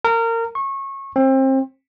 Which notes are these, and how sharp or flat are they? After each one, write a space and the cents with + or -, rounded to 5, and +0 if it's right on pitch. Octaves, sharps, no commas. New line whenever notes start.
A#4 -25
C#6 -25
C4 +30